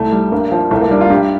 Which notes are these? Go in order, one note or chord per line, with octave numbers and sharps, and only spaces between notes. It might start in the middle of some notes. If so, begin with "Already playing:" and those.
Already playing: C2 A3
G3
G2 A#3
F3
C2 A3
A#3
G3 D4
F4
G2 G4